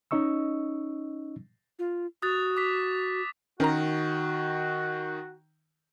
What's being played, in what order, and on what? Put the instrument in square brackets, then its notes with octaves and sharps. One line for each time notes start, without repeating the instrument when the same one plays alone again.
[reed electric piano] C#4 D#4 D#5 C#6 E6
[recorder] F4
[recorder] F#4 [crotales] D#6 F#6 A6
[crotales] D6 B6
[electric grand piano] D#3 [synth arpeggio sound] C#4 A#4 A#5 [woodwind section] F#4